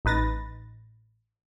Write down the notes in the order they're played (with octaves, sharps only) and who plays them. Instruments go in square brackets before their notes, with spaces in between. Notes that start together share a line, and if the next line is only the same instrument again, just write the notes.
[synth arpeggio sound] A1 D#4 B4 A6 A#6